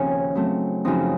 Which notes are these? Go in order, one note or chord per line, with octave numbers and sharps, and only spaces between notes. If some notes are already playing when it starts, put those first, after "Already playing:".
Already playing: D#2 C#3 F3 C4 C#4 D#4 C#5
C#3 F#3 A3 C4
F#2 C#3 F3 C4 D#4